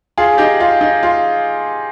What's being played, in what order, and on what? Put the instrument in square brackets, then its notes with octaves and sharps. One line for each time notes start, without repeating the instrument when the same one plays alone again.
[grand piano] F4 G#4
D#4 G4
F4
D#4
F4